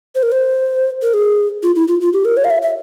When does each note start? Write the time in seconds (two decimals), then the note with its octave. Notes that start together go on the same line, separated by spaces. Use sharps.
0.15 C5
0.23 A#4
0.32 C5
1.02 A#4
1.14 G#4
1.63 F4
1.76 E4
1.88 F4
2.01 F4
2.13 G4
2.25 A#4
2.37 C#5
2.45 F5
2.50 E5
2.62 E5